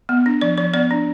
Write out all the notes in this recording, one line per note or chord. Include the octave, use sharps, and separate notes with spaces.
B3
D4
F3 D5
F3 D5
B3 D5
D4